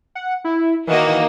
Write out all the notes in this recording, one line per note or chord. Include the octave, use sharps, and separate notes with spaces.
F#5
E4
D#3 E3 A#3 D#4 F#4 D#5